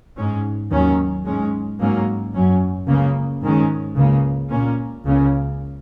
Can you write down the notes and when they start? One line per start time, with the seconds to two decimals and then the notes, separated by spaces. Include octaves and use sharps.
0.17 G#2 G#3 C#4
0.71 D#2 D#3 F#3 C#4
1.25 G#2 G#3 C#4
1.79 G#2 F#3 A#3 C#4
2.34 F#2 F#3 C#4
2.87 C#2 C#3 A#3
3.41 G#2 D#3 G#3 C#4
3.96 C#2 C#3 A#3
4.49 A#2 A#3 C#4
5.04 C#2 C#3 A#3 C#4